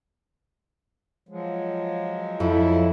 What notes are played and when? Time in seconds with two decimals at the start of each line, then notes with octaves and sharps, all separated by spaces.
1.29 F3 F#3 G#3
2.40 F2 E4